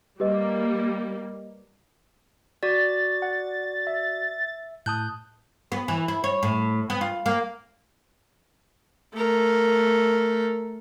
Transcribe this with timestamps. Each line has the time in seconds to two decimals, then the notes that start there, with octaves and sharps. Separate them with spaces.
0.20 G3 A#3 G4 B4 D#5
2.63 F#4 D5 A6
3.22 F#5
3.87 E5
4.86 A2 A5 D#6 F#6 G6
5.72 B3
5.88 E3
6.08 E4
6.24 C#5
6.43 A2
6.90 B3
7.01 F4
7.26 A#3
9.14 A3 A#4